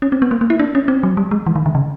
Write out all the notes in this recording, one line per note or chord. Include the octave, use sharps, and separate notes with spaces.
C#4
C4
B3
A#3
A#3
E4
D4
C#4
C4
F#3
G3
G#3
E3
D#3
D3
C#3